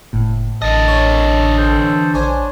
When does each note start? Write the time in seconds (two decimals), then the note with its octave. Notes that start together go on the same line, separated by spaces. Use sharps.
0.13 F#1 A2
0.62 A1 D3 D#5 A5
0.88 C#5
1.58 A4 C5
1.79 E3
2.14 A#1 D4 C5 C#5 G#5